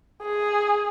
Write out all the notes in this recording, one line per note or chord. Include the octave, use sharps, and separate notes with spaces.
G#4